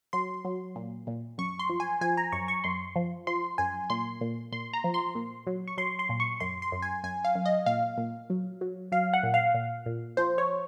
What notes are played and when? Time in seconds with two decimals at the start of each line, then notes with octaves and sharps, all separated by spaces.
0.13 F#3 C6
0.45 F#3
0.76 A#2
1.07 A#2
1.38 F#2 C#6
1.59 C6
1.70 F3
1.80 G#5
2.01 F3 G#5
2.17 A#5
2.32 F#2 C#6
2.48 C#6
2.64 F#2 C6
2.96 F3
3.27 F3 C6
3.58 F#2 G#5
3.90 A#2 C6
4.21 A#2
4.52 A#2 C6
4.73 A#5
4.84 F3
4.94 C6
5.15 A#2
5.47 F#3
5.68 C#6
5.78 F#3 C6
5.99 C6
6.09 A#2
6.20 C#6
6.40 F#2 C6
6.62 C6
6.72 F#2
6.82 G#5
7.04 F#2 G#5
7.25 F5
7.35 F#2
7.46 D#5
7.66 A#2 F5
7.98 A#2
8.30 F#3
8.61 F#3
8.92 F#3 F5
9.13 F#5
9.23 A#2
9.34 F5
9.54 A#2
9.86 A#2
10.17 F3 C5
10.38 C#5